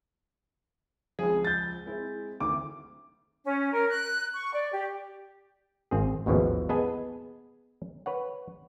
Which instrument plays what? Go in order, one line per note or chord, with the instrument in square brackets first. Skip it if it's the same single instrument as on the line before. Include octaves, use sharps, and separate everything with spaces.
[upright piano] C#2 F3 [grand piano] G#4
[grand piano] G6 A6
[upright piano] G#3 C4 E4
[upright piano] D2 D#3 [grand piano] D6
[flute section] C#4
A#4
F#6
C#6
D5
G4
[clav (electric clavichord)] G#1 C4 G#4
A1 D#2 G#2 B2 E3 F3
B3 G#4 B4 D#5 G#5 A5
B4 C#5 F#5